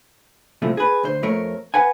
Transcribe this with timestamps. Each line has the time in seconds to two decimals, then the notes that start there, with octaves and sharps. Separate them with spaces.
0.62 C2 A2 C3 F3 A3
0.77 G#4 B4
1.03 D2 C5
1.23 F2 A3 A#4 C#5
1.74 B4 F#5 G#5